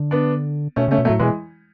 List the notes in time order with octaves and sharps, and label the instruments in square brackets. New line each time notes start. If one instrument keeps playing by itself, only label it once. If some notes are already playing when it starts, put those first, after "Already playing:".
Already playing: [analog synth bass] D3
[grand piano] B3 D4
[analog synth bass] B2 [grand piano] A3 C#4
[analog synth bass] C#3 [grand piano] A3 C#4
[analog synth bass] B2
[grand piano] F#3 A3
[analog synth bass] A2
[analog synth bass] B2 [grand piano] E3 G#3